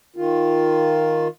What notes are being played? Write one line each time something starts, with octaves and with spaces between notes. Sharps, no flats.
D#3 F4